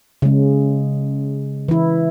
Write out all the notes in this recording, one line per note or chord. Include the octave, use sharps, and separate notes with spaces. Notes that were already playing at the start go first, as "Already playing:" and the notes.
C#3 G#3
E3 E4